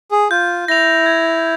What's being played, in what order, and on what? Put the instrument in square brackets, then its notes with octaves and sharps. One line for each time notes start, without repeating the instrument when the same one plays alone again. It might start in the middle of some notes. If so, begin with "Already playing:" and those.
[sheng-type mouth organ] G#4
[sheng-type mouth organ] F4 [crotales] G6
[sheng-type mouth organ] E4 [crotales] A#6 F7
[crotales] G#6